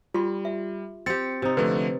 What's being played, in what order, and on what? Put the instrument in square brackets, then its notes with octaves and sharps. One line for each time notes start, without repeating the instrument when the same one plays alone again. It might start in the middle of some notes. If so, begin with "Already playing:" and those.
[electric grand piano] G3 [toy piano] F4 G4 C6
[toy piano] E5
[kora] C4 G4 [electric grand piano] A6 C#7
[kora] C3 D#4
[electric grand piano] D3 F3 A3 [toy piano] B4